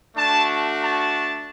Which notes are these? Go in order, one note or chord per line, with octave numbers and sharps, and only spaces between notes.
A3 D4 F#4 A5
A5